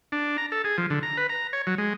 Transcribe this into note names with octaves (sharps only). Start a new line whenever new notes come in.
D4
A#5
A4
G#4
F3
D3
A#5
B4
A#5
C#5
F#3
G#3